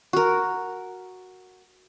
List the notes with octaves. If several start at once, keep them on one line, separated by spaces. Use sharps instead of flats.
F#4 A#4